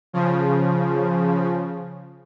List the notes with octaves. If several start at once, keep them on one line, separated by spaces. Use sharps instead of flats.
C#3 F3